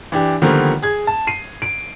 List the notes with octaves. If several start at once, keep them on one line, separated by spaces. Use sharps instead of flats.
E3 D4 G4
D3 D#3 F3 G3 A#3 B3
G#4 G#6
A5
C7 D#7
D7